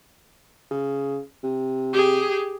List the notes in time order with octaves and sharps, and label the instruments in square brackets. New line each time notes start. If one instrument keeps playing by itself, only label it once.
[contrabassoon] C#3
C3
[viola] G4 G#4